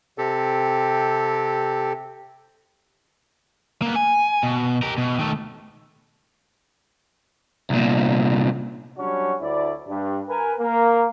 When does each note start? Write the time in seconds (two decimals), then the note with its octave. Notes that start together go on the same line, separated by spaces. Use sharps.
0.18 C3 C4 G4 A4
3.82 A#3 B3
3.95 G#5
4.43 B2
4.82 G4 A#4
4.98 B2
5.19 D#3 A3
7.70 C2 A#2
8.98 F#3 G3 C#4 D4 F#4 C#5
9.41 D2 E4 D5
9.88 G2
10.28 A#4 B4 G#5
10.59 A#3 A#4